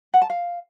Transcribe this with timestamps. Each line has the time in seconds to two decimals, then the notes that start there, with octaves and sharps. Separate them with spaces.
0.14 F#5
0.22 A5
0.30 F5